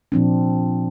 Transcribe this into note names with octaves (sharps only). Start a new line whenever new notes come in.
A#2 F3 C4 D4